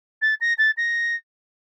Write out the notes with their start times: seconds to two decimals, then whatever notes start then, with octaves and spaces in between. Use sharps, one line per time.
0.22 A6
0.41 A#6
0.58 A6
0.77 A#6